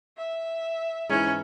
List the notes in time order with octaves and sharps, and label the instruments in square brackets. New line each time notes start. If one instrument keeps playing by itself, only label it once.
[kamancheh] E5
[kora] G#2 E3 [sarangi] C#4